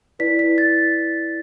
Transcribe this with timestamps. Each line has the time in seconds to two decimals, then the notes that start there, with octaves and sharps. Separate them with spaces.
0.19 E4 B4 D5 B6
0.39 B6
0.58 A6